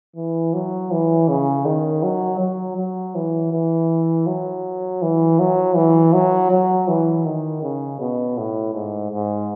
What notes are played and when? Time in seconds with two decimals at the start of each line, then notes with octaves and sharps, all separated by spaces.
0.16 E3
0.53 F#3
0.91 E3
1.29 C#3
1.65 D#3
2.03 F#3
2.40 F#3
2.77 F#3
3.15 E3
3.52 E3
4.27 F#3
5.02 E3
5.39 F#3
5.76 E3
6.13 F#3
6.51 F#3
6.88 E3
7.25 D#3
7.62 C#3
8.00 B2
8.37 A2
8.74 G#2
9.11 G#2